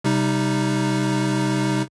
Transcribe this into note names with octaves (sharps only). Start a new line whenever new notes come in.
C3 G3 D#4